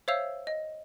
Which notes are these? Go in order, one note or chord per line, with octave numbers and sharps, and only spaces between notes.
C5 C#5 E5 F5 E6 F7
D#5